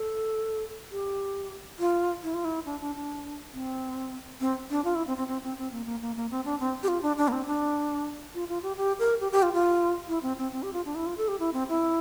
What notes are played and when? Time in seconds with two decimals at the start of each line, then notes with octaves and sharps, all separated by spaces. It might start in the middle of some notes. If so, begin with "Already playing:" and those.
Already playing: A4
0.91 G4
1.79 F4
2.23 E4
2.34 F4
2.45 E4
2.66 D4
2.81 D4
2.96 D4
3.53 C4
4.40 C4
4.70 D4
4.84 F4
4.95 E4
5.07 C4
5.17 C4
5.27 C4
5.43 C4
5.58 C4
5.72 A#3
5.86 A#3
6.01 A#3
6.16 A#3
6.31 C4
6.45 D4
6.60 C4
6.83 G4
6.88 F4
7.02 D4
7.18 D4
7.28 A#3
7.32 C4
7.46 D4
8.34 F4
8.48 F4
8.62 G4
8.77 G4
8.99 A#4
9.21 G4
9.32 G4
9.43 F4
9.53 F4
10.08 E4
10.22 C4
10.38 C4
10.52 C4
10.63 G4
10.73 F4
10.85 D4
10.95 E4
11.06 F4
11.17 A4
11.28 G4
11.39 E4
11.53 C4
11.69 E4